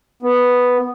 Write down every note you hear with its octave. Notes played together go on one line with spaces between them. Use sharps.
B3